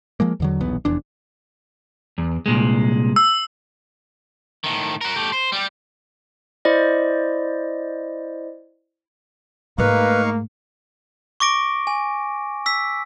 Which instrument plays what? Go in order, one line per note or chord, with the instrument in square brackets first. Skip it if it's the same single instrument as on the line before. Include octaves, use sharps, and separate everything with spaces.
[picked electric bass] F3 G#3 A#3
E2 D3 F#3
D#1 B1 E2 B3
F1 E2 D4
[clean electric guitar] E2
C2 A#2 G#3
[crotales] E6
[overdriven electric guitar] A2 D#3
F#4 A#4
A3 G4
C5
G3 G4
[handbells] E4 C5 D5 D#5
[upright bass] G#2 A3 [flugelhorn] A#3 [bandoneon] D#4 F5 C#6 [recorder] B4
[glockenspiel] C#6 D6 A#6 D7
G#5
E6 B6